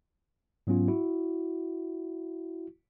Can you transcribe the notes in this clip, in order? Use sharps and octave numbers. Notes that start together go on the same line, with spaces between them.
G#2 F#3 B3 C#4 F4
E4 F#4